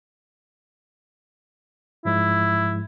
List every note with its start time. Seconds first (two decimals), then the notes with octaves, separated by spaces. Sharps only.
2.05 G#2 F3 G#3 E4